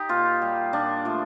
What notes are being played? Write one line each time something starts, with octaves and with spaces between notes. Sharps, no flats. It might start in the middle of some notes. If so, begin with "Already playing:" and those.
Already playing: D#4 G4
A#2 F4
G3
A#2 D4
F3 A3